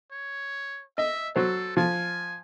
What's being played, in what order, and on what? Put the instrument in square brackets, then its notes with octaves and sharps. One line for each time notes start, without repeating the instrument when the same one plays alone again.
[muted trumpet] C#5
[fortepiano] D#5 [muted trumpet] E5
[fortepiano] F#3 C5 [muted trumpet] A4
[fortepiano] F3 [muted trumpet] G#5